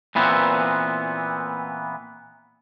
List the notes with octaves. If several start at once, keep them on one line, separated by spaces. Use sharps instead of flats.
A#2 E3 B3 C4